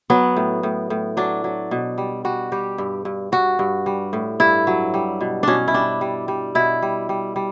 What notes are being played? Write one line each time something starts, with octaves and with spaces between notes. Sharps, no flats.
F#3 B3
A2
A2
A2
F#3 D4
F#3
B2
G3
G3 F#4
G3 G4
G2
G2
G2 F#4
G2
G3
A2
G2 E4
F#3
G3
B2
B2 C#4 D4
E4
G3 D4
G3
G3
B2 E4
G3
G3
G3